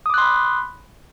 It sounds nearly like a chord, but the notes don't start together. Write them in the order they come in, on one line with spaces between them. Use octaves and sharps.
D#6 D6 F#6 C6 B5